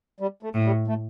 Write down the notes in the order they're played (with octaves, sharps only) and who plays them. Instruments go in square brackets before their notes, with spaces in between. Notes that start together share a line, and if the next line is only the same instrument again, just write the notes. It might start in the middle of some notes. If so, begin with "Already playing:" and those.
[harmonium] G3
A3
[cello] A2
[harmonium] G3
A3